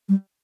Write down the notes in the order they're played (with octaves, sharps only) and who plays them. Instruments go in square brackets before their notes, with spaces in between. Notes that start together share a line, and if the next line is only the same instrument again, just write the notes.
[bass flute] G3